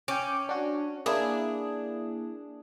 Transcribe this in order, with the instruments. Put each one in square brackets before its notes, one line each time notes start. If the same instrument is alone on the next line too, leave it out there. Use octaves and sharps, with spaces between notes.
[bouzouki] C#4 [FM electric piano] G5 D6
[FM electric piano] D4 F#4
[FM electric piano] A#3 E4 [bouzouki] D4 G#4